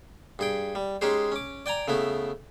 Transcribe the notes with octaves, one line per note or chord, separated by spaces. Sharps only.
G2 G#4 G5
G3
G#3 C#4 D#4 G4 G#4 C5
C#4 D6
D5 G5 G#5 A#5
C#3 A3 B3 E4